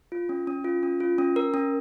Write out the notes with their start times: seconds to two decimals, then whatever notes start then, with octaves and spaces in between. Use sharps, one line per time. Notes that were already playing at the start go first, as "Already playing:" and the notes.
0.12 F4
0.29 C#4
0.47 C#4
0.64 F4
0.83 C#4
1.00 F4
1.18 C#4
1.36 A#4
1.54 C#4